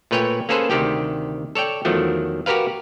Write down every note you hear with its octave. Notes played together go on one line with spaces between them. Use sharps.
A#2 A3 B4 C#5 G5 G#5
A#3 C#4 G#4 A4 B4 C5
D2 C3 D#3 G4 G5
A4 C#5 D5 G5
E2 D#3 F3 F#3 A3
F#4 G4 A#4 B4 F5